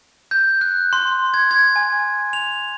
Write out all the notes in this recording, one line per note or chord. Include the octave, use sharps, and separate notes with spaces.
G6
F#6
C6
G#6
G#6
G#5
F7